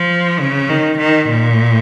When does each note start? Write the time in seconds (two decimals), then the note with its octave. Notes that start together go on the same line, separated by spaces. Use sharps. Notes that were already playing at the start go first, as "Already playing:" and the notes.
Already playing: F3
0.39 C#3
0.69 D#3
0.98 D#3
1.28 A#2